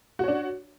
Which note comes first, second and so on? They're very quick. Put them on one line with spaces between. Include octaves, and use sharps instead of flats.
F#4 C#5 D4